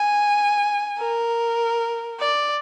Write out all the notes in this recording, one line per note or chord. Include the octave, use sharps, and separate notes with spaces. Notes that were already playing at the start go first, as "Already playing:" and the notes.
Already playing: G#5
A#4
D5